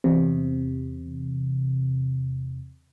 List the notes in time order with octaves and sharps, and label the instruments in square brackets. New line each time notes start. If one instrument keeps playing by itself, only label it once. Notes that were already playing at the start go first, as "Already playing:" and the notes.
[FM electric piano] E2 C3